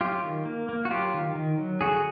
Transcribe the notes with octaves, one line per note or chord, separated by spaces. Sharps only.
F#3 F4 G4
D#3
A#3
A#3
F#4
F#3 F4 G4
D#3
D#3
F#3
D3 F#4 G#4